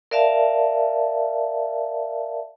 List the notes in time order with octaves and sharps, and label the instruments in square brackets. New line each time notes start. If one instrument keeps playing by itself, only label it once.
[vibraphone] A#4 D5 E5 F5 A5